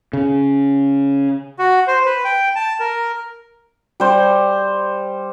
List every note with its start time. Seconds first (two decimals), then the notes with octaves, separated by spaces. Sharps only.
0.13 C#3
1.59 F#4
1.87 C5
2.06 B4
2.24 G5
2.56 A5
2.80 A#4
4.00 G3 C5